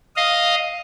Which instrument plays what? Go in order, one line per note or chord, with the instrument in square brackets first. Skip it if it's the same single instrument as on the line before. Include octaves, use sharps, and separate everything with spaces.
[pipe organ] D#5 F5